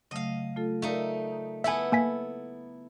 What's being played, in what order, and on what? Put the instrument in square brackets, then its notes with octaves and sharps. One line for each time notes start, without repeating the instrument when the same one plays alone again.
[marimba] C#3 F#3 A3 [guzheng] D#5 F5
[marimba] A3 F4 A4
[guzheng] A3 D#4 [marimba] A#4 D5 F5
[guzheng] B3 E4 A4 [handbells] E5 G#5
[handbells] A#3 G#5 B6